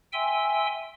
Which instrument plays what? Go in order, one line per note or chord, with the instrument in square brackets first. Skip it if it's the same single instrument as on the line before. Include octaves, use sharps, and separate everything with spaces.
[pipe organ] E5 G5 G#5 C6 E6